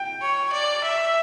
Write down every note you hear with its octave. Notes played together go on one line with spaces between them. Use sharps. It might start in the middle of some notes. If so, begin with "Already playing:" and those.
Already playing: G5
C#5
D5
E5